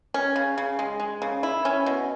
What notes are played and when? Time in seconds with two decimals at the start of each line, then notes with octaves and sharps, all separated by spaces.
0.14 C#4
0.36 C#3
0.58 C#3
0.79 G#3
1.00 G#3
1.22 C#3
1.43 E4
1.65 C#4
1.86 B2